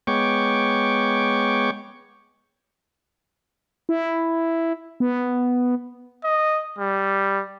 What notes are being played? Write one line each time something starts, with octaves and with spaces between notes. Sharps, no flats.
G#3 B3 C#5 G5 C#6 D6
E4
B3
D#5
G3